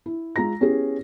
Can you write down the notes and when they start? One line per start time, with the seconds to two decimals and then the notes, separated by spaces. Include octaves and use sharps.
0.06 E4
0.36 G#3 F4 A#5 A#6
0.60 B3 C#4 E4 G4 G#4